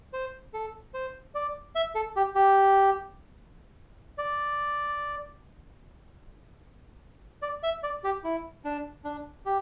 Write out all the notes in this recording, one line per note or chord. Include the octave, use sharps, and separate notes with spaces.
C5
A4
C5
D5
E5
A4
G4
G4
D5
D5
E5
D5
G4
E4
D4
D4
G4